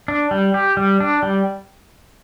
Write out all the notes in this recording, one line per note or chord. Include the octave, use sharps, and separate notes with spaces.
D4
G3
G4
G3
D4
G3